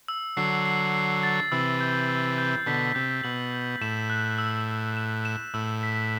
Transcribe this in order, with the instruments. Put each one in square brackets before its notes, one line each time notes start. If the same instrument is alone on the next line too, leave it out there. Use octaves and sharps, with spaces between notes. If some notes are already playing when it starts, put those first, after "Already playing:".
[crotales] E6
[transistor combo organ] D3 F#3 [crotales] C7
[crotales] C7
C7
A6
[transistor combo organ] C3 E3 [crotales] E6
[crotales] G6
E6
G6
[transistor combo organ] B2 D3 [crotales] B6
[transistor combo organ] C3 [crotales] G6
[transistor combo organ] B2 [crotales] F#7
[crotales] G6
[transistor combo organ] A2 [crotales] E7
[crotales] F#6
E6
E6
E7
E7
[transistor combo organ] A2 [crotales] E6
[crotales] B6